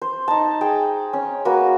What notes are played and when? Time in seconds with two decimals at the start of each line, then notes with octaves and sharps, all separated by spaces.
0.02 C5
0.28 D#4 A5
0.61 G#4 G5
1.13 C#4
1.45 A#3 F#4 B4